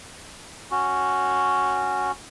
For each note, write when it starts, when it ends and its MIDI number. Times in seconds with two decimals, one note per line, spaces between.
0.71 2.11 61
0.71 2.11 66